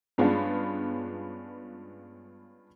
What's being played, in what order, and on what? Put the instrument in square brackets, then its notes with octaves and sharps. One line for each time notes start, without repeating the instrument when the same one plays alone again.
[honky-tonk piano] G2 G#3 B3 C#4 D4 F4